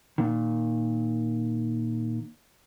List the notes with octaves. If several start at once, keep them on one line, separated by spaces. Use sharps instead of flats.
A#2 D#3